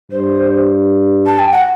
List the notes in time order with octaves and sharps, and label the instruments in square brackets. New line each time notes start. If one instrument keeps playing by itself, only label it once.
[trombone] G2 [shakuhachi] C5
[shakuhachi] A5
G5
F#5